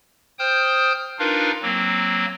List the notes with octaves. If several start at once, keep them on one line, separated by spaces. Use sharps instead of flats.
C5 G5 D#6 F6 G6
D4 D#4 F4 A#4 B4 F5
F#3 A#3 C4